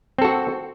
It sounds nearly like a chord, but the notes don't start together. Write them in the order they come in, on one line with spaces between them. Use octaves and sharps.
C4 A4 F#4